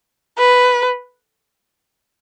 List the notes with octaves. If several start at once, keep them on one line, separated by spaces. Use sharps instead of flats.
B4